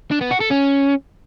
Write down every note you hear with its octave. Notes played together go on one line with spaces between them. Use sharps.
D4
B3
F#4
A4
C#4